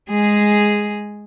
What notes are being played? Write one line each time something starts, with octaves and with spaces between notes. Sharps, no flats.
G#3 G#4